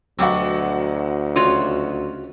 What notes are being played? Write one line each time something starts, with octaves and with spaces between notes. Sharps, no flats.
D2 B2 F#3 G3 C4 F#5
C#2 F4 F#4 C#5